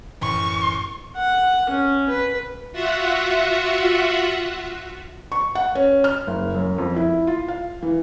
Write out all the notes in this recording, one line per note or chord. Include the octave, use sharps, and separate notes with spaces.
F#2 A2 E3 C#6
F#5
C#4
B4
F4 F#4 E5 F#5
C#6
F#5
C#4
F6
F#1
F#2
F2
E4
F4
F5
E3